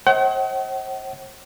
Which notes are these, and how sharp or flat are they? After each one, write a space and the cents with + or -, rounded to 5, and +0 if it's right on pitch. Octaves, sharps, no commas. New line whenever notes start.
C5 +45 D#5 +45 F#5 +45